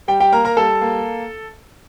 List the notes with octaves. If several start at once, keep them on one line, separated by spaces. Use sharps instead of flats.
G3 G4 G5
G4 G5
A#3 A#4 A#5
A#4 A#5
G3 A4 A5
A#3